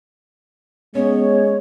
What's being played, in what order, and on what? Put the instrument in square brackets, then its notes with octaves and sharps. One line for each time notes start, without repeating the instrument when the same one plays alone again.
[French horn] G#3 [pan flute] B3 [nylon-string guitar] C#4 [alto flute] C#5